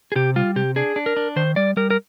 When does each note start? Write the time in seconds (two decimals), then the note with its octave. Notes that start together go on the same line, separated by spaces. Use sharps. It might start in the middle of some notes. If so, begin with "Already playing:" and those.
0.12 G#4
0.16 C3 G4
0.36 G3 F4
0.56 C3 G4
0.76 D4 G#4
0.96 D4
1.06 A#4
1.17 D4
1.36 D#3 C5
1.56 G3 D5
1.77 G3 A#4
1.90 A#4